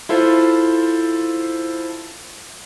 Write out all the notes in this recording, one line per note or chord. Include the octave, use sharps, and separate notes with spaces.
E4 F4 A4 C5